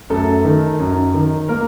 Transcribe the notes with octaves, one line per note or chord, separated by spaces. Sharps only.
F#2 A3 A4
D#3
F#2
D#3
A#3 A#4